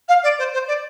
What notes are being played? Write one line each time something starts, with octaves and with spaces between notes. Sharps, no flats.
F5
D5
C5
C5
D5